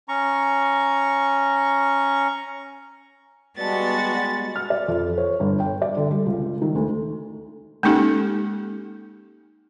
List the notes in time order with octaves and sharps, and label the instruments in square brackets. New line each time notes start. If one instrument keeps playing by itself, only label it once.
[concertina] C#4 A#5 C#6
[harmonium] G3 G#3 [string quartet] B3 F#4 [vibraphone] D5 A5 [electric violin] A6
[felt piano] F6
D5
F2
C#5
G1
G5
D5
D3
G3
C#2
D#3
D2
[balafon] G#3 A#3 C#4 D#4 G4 A4